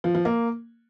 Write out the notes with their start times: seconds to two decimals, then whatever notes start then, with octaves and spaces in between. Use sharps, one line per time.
0.04 F3
0.15 F3
0.25 A#3